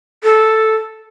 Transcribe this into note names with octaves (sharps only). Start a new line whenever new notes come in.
A4